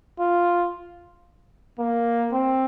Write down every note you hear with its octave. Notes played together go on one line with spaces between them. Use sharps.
F4
A#3
C4